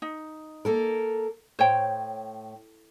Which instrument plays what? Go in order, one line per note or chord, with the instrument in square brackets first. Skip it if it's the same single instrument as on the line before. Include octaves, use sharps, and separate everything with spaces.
[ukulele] D#4
[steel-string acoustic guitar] A#3 A4 A#4
[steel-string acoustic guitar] A2 [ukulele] C5 C#5 G5